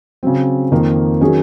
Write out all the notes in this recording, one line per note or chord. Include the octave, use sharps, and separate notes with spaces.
C#3 F#3 C4
F2 D#3 A#3
D#3 F#3 C#4 G#4